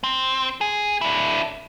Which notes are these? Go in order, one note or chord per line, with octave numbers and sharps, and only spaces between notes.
C4
G#4
D4 E4